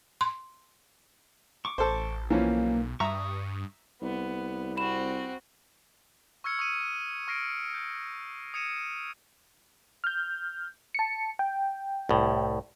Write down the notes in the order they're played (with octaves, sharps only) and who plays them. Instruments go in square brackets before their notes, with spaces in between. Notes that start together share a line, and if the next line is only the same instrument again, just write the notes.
[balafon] C6
[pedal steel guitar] C#6 D6
[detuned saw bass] A1 [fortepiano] A4 C5
[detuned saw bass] B1 [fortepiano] E3 F3 C#4 [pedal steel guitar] A#3
[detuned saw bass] G2 [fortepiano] E5 A#5 [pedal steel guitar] C#6 D#6
[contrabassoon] C2 [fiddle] B3
[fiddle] C4 F#4 [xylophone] B5 E7
[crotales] C#6 E6 F6 G#6 C#7
C#6 D#6 G#6 D#7
C#6 F6 A#6 C7 D7
G6
D#6 G#6 C#7 D#7 E7
[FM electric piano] F6 G6
A5 C#7
G5
[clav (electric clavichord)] C2 A2